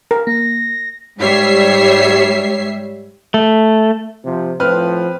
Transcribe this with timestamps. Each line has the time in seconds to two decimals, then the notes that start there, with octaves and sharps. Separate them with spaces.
0.11 A#4
0.27 A#3 A#6
1.19 G#2 G3 C#5 E5 C7
3.34 A3
4.25 C3 F3
4.60 A2 F3 C4 B4 F6